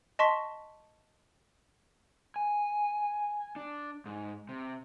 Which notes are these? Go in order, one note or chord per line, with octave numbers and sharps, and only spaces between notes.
D#5 A5 C6 C#6 B6
G#5
D4
G#2
C3